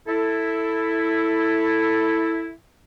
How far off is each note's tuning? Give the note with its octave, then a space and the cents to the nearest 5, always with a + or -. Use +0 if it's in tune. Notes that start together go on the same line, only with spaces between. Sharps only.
E4 +0 A4 +10